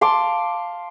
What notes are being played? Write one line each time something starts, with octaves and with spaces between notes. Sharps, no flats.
F5 A5 C6 D6